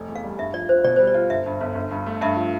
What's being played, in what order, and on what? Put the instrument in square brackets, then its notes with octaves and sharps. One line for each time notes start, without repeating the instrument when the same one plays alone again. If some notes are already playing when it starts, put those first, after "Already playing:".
Already playing: [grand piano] F1
E2
[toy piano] F5
[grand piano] G3
[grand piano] G2 [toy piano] E5
[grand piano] F3 [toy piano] D5
[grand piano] F4 [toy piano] C5
[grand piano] B2 [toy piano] D5
[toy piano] C5
[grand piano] G3
[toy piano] D5
[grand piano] F4
[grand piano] G1 [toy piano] E5
[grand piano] G2
G1
G1
G2
A3
[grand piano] G2 [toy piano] E5
[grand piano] F3